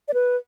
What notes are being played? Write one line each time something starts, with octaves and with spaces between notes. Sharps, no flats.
D5
B4